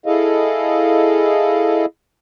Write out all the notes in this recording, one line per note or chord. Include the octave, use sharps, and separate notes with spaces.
E4 G#4 A4 D#5 F5